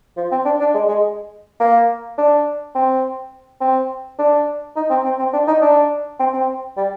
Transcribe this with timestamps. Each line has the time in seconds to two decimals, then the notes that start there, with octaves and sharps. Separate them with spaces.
0.17 F3
0.31 C4
0.45 D4
0.60 D4
0.74 G#3
0.89 G#3
1.60 A#3
2.18 D4
2.75 C4
3.61 C4
4.19 D4
4.76 D#4
4.90 C4
5.04 C4
5.19 C4
5.33 D4
5.47 D#4
5.62 D4
6.20 C4
6.33 C4
6.77 G3